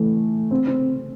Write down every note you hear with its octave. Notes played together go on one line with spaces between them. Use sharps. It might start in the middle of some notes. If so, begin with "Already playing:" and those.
Already playing: E3 A3
C4
C4